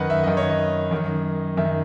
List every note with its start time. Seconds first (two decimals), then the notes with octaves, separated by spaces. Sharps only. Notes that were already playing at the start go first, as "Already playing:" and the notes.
Already playing: F#2 D#3 B4 D#5 F#5
0.10 E5
0.23 F#2 D#3 D#5
0.37 C#5
0.50 D#5
0.91 F#2 D#3
1.57 F#2 D#3 E5